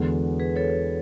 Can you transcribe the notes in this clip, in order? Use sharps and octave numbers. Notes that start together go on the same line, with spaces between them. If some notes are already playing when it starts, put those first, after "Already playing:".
Already playing: E2 D3 G#3 B3 F#4 A4
G#4 B4
A4 C#5